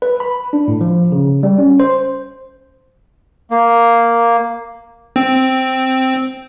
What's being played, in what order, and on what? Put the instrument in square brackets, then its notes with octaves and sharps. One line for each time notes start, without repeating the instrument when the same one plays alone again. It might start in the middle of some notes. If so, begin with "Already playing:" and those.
[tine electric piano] B4
B5
D4
A2
F3
C#3
G3
C#4
C5
[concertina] A#3
[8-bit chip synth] C4